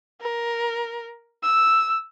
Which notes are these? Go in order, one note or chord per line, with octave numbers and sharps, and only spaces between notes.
A#4
E6